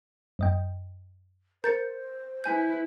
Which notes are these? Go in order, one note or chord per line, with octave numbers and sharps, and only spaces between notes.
F#2 D#5 G5
A#4 C5 G6 A6 C#7
E4 B4 G#5 G6